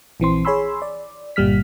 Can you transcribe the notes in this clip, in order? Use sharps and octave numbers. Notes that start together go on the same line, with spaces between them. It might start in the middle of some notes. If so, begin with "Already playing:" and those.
A#1 E3 C4 C6
G#4 C#5 G#5 B5 C6 E6
D5
G1 A#2 G3 F6 B6